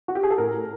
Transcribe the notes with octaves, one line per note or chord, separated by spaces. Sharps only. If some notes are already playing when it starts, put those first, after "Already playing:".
F#4
G4
G#4
A4
A2 A#4